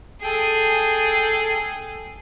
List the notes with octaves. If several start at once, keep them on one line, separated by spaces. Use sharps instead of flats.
G#4 A4 G5